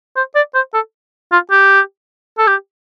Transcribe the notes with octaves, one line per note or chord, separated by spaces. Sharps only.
C5
D5
C5
A4
F4
G4
A4
G4